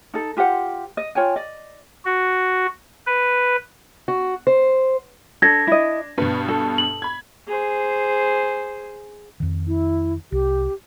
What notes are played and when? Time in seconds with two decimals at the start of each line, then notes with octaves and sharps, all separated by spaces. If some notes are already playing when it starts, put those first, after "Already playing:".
0.14 D#4 A4
0.37 F4 G4 C5 F#5
0.97 D#5
1.15 F4 C#5 G5 G#5
1.36 D5 D#5
2.05 F#4
3.07 B4
4.08 F#4
4.47 C5
5.42 D4 A4 G#6 A#6
5.67 E4 D#5
6.18 G2 B2 B4
6.48 A4
6.78 F#7
7.02 B5 G#6
7.48 G#4 C5
9.40 F2 D#3
9.67 E4
10.32 C2 G4